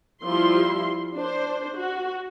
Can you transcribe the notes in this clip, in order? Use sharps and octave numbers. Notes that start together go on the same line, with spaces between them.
F3 G3 E4 C6
D4 C5
F#4